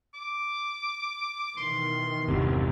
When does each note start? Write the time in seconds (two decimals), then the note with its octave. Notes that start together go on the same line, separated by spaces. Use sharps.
0.14 D6
1.57 B2 D#3 E3 C6
2.28 G1 E2 C3